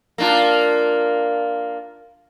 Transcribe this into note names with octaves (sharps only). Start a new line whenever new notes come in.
A#3 D4 F4